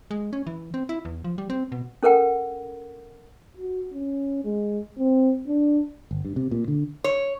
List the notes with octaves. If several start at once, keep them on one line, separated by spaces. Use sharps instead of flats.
G#3
C#4
E3
C4
E4
E2
F3
G3
C4
B2
C#4 A4 A#4 F#5 G5
F#4
C#4
G#3
C4
D4
G1
G2
C3
A#2
D3
C#5